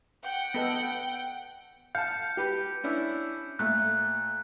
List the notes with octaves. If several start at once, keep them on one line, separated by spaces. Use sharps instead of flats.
F#5 G5
B3 A4 D#5
F5 A5 G6 C#7
G4 B4
C#4 D4 E4
A#2 A3 F#6